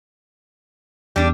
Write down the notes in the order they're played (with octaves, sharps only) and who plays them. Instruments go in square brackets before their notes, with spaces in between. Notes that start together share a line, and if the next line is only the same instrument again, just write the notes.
[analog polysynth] E2 [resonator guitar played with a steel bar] G3 D4